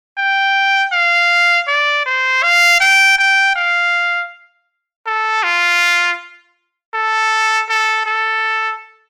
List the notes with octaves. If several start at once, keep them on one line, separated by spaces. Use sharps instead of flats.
G5
F5
D5
C5
F5
G5
G5
F5
A4
F4
A4
A4
A4